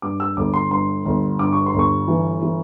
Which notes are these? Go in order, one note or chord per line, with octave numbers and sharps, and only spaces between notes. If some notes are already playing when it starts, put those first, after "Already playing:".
G2 D6
E6
G1 D6
C6
G2 C6
G1
G2 D6
C#6
C6
G1
C#6
E3
E3